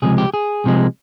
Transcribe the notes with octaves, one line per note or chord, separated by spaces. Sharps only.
C#2 C3 F3 G#3 G#4
G4
G#4
C2 C3 F3 G#3